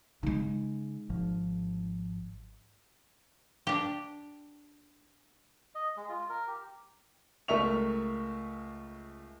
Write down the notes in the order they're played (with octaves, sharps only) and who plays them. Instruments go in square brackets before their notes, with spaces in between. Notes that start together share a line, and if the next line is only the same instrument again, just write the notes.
[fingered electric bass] C#3 [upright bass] G#3 D#4
[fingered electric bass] G#1 F3
[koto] D4 G4
[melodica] D#5
G#3
F4
A#4
G4
[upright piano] C#2 A3 A#4 E5 C#6 F7